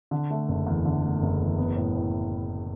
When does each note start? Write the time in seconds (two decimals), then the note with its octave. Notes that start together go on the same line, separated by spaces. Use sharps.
0.11 D3
0.30 A3
0.48 F#1
0.67 E2
0.85 D3
1.03 A3
1.22 F#1
1.40 E2
1.59 B3
1.76 A2
1.95 A2